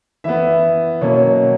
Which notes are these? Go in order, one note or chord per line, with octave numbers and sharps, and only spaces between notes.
E3 B3 E5
B2 F#3 A#3 C#4 C#5